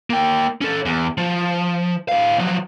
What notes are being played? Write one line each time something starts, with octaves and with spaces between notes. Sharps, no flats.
A#3 G5
C#4 A4
E2
F3
A2 F5
F3 F#3